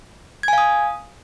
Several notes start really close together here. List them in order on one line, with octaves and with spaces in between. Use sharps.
G#6 G#5 F5 D#6